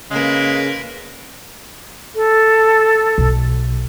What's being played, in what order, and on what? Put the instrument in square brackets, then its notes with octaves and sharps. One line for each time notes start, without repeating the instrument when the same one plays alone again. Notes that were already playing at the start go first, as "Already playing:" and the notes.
[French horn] C#3 [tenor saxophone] G#3 [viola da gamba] A#3 A#4 B4
[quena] A4
[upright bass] B1